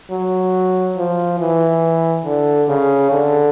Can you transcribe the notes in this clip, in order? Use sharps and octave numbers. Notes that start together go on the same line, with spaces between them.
F#3
F3
E3
D3
C#3
D3